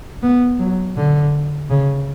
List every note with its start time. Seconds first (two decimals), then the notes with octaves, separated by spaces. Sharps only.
0.23 B3
0.59 F#3
0.97 D3
1.70 C#3